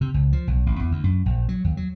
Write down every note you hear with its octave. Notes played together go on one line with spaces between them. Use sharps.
C3
C#2
F3
B1
A1
E2
D2
F#2
A#1
F#3
D#2
F#3